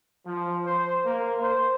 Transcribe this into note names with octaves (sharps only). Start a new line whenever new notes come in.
F3
C5
A#3
C5